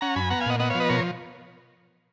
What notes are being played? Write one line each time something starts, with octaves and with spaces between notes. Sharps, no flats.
C#4 F#5 A#5
F#2 G#5 B5
B3 F#5 A#5
F5 G#5
A#2 D#5 F#5
B3 D#5 F#5
C#5 F5
F3
B4 D#5
B2 A#4 C#5